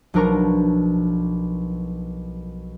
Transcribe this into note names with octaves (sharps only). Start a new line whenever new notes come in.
B1 F3 D4 A#4 A#5 C#6